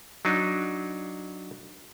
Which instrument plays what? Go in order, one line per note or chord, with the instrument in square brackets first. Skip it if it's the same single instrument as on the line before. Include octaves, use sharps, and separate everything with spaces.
[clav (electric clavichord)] F#3 D4 D#4